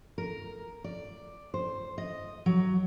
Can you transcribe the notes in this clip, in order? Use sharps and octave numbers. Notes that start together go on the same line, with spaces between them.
A#4
D5
C5
D#5
F#3